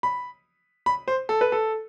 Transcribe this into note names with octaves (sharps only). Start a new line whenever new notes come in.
B5
B5
C5
A4
B4
A4